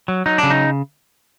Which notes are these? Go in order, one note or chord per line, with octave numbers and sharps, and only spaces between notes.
F#3
F#3 D#4
C#3 D4
D#4